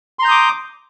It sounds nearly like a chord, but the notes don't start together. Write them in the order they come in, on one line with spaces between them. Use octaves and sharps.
C6 A#5 G6 D#6 D6